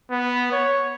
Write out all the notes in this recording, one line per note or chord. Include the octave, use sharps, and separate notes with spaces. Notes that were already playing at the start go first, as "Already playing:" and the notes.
B3
C#5